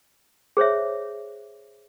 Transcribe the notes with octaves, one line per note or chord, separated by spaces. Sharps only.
G#4 C5 C#5 E5